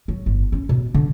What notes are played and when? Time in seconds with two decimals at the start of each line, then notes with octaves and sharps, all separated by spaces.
0.08 F#3
0.26 G1
0.52 C#4
0.69 B2
0.94 D3